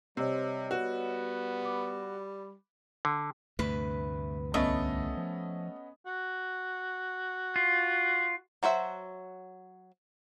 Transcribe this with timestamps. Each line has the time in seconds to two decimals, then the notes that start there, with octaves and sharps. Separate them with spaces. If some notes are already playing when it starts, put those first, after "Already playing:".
0.17 C3 G3 C5 C#5 D#5 E6
0.71 B3 F#4
1.62 B5 D6
3.05 D3
3.59 D2 G2 C3 A3 B4
4.54 C2 A3 B3 C#4 D#5
5.17 F3
6.06 F#4
7.56 F4
8.63 F#3 F#4 C5 E5